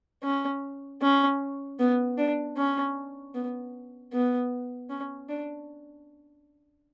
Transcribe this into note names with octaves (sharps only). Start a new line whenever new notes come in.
C#4
C#4
B3
D4
C#4
B3
B3
C#4
D4